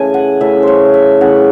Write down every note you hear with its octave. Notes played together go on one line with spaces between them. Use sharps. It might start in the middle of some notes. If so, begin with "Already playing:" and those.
Already playing: C#3 E3 A3 G#5
F#5
C#3 E3 A3 E5
C5 C#5
E5
C#3 E3 A3 F#5